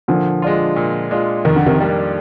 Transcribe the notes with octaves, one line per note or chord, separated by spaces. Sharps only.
A#2 D3 F3
G#3 D4 F4
A#2
G#3 D4 F4
F2 D#3
D3
C3 D#3
D#3 G3 A#3 D4